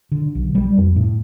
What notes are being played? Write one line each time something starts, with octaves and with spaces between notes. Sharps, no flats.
D3
B1
G3
F2
A2